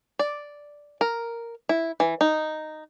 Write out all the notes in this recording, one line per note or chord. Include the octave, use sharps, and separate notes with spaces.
D5
A#4
E4
E3
D#4